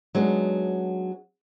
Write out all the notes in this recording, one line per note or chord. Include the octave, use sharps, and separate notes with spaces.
F#3 G#3 B3 D4 D#4